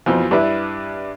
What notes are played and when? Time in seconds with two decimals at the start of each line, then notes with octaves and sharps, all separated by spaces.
0.06 F2 B2 E3 F3
0.31 G2 D4 E4 B4 E5